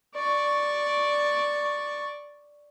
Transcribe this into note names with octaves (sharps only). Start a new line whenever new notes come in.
D5 C#6